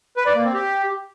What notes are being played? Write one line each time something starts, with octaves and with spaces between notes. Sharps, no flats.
B4
D5
A#3
C4
G4